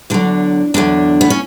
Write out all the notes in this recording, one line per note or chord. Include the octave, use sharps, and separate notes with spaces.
E2 D3 F#3 D4
E2 D3 F#3 D4
B3
C#4